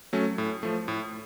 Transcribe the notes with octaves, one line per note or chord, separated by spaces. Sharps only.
F#3 A3 C#4
A2
F3 A3
A2